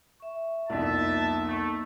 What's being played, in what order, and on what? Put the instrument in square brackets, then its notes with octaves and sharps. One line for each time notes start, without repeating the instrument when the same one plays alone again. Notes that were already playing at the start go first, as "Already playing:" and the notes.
[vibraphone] E5 C#6
[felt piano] C2 F2 [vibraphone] A#3 B3 D#4 [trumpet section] E5 A5
[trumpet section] A3